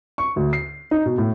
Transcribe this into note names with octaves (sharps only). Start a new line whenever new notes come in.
C#6
D2
C7
D#4
B2
A2